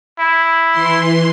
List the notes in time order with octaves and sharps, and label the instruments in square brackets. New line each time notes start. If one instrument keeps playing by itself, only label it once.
[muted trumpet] E4
[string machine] E3 C6